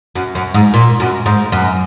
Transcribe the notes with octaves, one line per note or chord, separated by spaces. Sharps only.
F#2
F#2
G#2
A#2
F#2
G#2
F#2